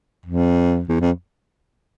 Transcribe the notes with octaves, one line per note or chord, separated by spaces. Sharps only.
F2
E2
F2